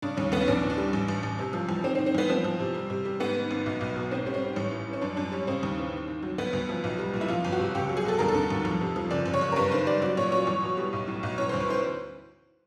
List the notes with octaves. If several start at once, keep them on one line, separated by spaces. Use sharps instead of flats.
C#3 D4
D#2 C#4
D#2 B3
C#4
A#1 D4
E3
D4
G3
A1
A1
A1
C3
F3
E2
D#3 C4
C4
D#3
C4
E2 B3
F3 C4
F3
C3
G3
C3
G3
G#2 B3
D#3
G#1
B1
B1
B2
G#2 C4
G3 C#4
C4
G3
A1 C#4
E3
E3
C#4
F#2 D4
F#2 D4
G3 C#4
C#3 C4
D#2
E3
D#3
D#3
F#3
D2 B3
D2
F3
B1
G3
A#2
E4
F2 F4
G1
F#4
C3
C#2 G4
F#3
G#4
B2 A4
D#2 A#4
A4
D3
D#2
F2
C3
F3
F#1 D5
F#1
C#5
F#1
A#4
G2 B4
D#3 C5
G3 D5
F#3 D5
A#2 C#5
F#3 C#5
E2
B2
G3
B1
A2
B1
E3 C#5
D2 C5
B4
E3 C5